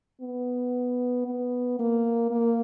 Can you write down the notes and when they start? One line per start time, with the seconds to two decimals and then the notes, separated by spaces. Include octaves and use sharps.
0.21 B3
1.27 B3
1.79 A#3
2.31 A#3